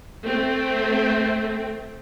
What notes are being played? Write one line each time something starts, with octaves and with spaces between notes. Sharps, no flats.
A3 C4